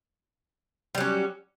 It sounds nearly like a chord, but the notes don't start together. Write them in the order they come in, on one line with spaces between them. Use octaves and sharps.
G3 F#3 C#4